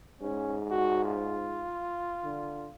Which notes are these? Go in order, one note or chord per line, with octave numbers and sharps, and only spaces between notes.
G#2 C#4
F#4
F4
D3